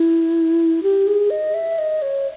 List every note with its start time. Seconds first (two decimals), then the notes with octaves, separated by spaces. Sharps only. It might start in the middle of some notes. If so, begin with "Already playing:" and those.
Already playing: E4
0.83 G4
1.07 G#4
1.30 D#5
1.54 E5
1.79 D#5
2.02 C#5